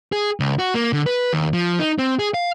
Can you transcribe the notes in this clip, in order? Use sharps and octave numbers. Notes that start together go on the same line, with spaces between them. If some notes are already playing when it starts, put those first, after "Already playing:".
G#4
C#2
F#4
A#3
D3
B4
D#2
F3
D#4
C4
G#4
F5